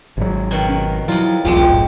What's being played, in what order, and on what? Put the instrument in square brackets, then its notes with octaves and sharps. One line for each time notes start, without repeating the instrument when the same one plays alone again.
[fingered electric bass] G#1 F#3
[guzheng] B2 D#3
[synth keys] C#4
[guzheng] F2 F4 [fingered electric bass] F#3 [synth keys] E4
[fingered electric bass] E1 [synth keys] C2 F4 [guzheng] F#3 G#3 G4
[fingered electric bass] F#1 A2 [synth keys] D#5